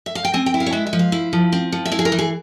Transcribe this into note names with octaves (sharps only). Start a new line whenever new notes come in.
E5
F5
G5
C4 G#5
G5
E4
F5
C#5
G#3 E5
E5
F3
F5
E4
F3
C4
F3
E5
E4 F5
G#4
A#4
E3
G#4